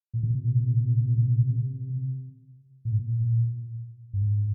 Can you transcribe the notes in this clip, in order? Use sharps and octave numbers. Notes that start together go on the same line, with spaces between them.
A#2
C3
A#2
C3
A#2
C3
A#2
C3
A#2
C3
A#2
C3
A#2
C3
A#2
G#2
A#2
G2
G#2